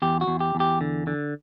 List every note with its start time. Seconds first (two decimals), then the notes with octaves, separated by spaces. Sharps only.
0.02 E2 G4
0.21 F#4
0.28 E2
0.40 G4
0.55 E2
0.60 G4
0.81 D3
1.07 D3